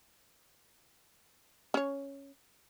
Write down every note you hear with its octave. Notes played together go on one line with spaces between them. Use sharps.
C#4 C#5